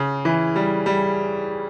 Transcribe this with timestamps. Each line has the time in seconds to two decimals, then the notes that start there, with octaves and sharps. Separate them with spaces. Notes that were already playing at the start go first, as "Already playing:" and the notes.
Already playing: C#3
0.25 E3
0.56 G3
0.86 G3